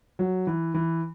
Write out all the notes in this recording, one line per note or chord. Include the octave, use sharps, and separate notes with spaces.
F#3
E3
E3